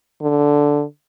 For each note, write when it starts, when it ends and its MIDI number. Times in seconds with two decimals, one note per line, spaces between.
0.22 0.83 50